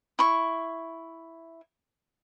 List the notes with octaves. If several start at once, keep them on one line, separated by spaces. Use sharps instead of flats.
E4 C#6